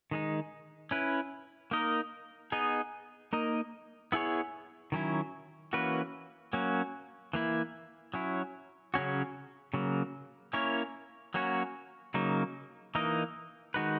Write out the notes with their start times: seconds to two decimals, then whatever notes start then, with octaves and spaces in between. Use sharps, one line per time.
0.11 D#3 G#3 D#4
0.91 C#4 E4 B4
1.71 A#3 D#4 A#4 D#5
2.52 B3 D#4 G#4 D#5
3.33 A#3 D#4 A#4 D#5
4.12 B3 E4 G#4 C#5
4.92 D#3 F#3 C#4 E4
5.73 E3 A#3 C#4 F#4 B4
6.53 F#3 A#3 C#4
7.33 E3 A#3 E4
8.14 F#3 C#4 E4
8.94 C#3 F#3 C#4 F#4
9.74 C#3 F#3 A#3
10.53 A#3 C#4 E4 A#4 C#5
11.34 F#3 A#3 C#4 F#4 C#5
12.14 C#3 F#3 A#3 D#4
12.95 E3 A#3 D#4 A#4 D#5
13.74 D#3 G#3 D#4 F#4 B4